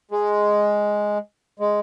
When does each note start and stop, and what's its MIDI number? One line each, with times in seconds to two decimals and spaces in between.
0.11 1.18 56
1.60 1.80 56